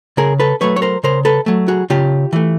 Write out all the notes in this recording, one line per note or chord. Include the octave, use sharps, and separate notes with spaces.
C#3 G#4 A#4
A4 B4
F#3 A3 B4 C#5
C#5
A#4 C5
C#3 A#4 C5
A4 B4
F#3 A3
F#4 G#4
C#3 F4 G4
E3 A3